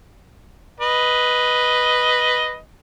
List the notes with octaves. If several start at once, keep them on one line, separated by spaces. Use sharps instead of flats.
B4 D#5